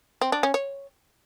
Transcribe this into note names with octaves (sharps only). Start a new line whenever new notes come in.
C4
D4
C#4
C#5